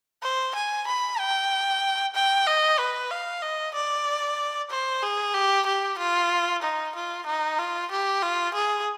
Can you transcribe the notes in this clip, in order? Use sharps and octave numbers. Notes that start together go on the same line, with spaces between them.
C5
G#5
B5
G5
G5
D#5
B4
F5
D#5
D5
C5
G#4
G4
G4
F4
D#4
F4
D#4
F4
G4
F4
G#4